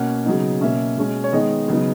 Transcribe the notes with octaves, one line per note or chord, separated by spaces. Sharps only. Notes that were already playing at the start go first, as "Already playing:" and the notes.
Already playing: B2 A#3 C#4 F#5
C#3 F#3 B3 D#4
B2 A#3 C#4 E5
B2 G#3 C#4
C#5
D#3 G#3 B3 D#4 D#5
C#3 F#3 B3 D#4